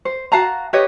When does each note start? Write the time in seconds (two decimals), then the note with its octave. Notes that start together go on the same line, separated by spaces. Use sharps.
0.05 C5
0.32 F#4 F5 A5 A#5
0.73 G4 B4 C#5 D#5